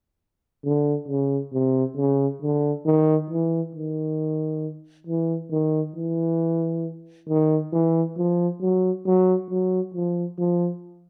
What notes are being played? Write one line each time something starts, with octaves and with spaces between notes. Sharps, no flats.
D3
C#3
C3
C#3
D3
D#3
E3
D#3
E3
D#3
E3
D#3
E3
F3
F#3
F#3
F#3
F3
F3